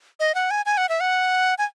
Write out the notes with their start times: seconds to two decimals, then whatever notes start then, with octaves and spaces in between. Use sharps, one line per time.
0.20 D#5
0.35 F#5
0.51 G#5
0.66 G#5
0.78 F#5
0.89 E5
1.00 F#5
1.58 G#5